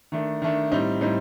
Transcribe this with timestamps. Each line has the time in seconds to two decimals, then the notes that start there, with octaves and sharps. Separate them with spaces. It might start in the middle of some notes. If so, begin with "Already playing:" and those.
0.12 D#3 A3 D4
0.42 D#3 A3 D4
0.72 A2 G3 C4 D#4
1.01 A2 G3 C4 D#4